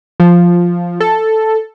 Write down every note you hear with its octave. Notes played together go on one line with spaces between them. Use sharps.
F3
A4